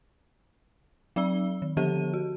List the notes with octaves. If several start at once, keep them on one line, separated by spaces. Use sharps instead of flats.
F#3 C4 D5 E6 G7
D#3
D3 F3 G4 A4 A5 D#7
F#4